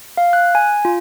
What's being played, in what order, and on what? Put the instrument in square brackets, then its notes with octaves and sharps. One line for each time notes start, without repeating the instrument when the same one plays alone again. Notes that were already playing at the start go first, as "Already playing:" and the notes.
[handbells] F5
F#6
G#5
F4